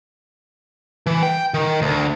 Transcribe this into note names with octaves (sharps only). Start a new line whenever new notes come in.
E3
G5
D#3
D2